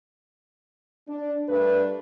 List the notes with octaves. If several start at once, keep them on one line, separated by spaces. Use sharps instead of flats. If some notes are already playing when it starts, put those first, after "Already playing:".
D4
G2 A3 D4 A#4 B4